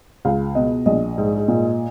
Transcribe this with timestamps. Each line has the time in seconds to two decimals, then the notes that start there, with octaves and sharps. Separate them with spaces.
0.25 C#2 F5
0.55 B2 D#5
0.86 A#1 D#5
1.18 G#2
1.48 A#2